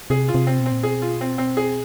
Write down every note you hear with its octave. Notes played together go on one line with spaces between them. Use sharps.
C3 G#4
F4
C3
C4
B2
C4
A#2
B2 G#4
F4
C4
C4
G#4